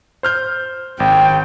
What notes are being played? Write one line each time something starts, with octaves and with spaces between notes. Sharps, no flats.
C5 F6 G6
G#1 G5